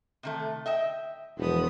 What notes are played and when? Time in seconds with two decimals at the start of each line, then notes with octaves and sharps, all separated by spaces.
0.23 C3 D#3 A3
0.66 D#5 E5 G5
1.38 E1 F3 B3 D#6